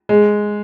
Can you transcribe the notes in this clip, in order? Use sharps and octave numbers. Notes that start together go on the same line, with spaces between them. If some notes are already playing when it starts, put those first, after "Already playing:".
G#3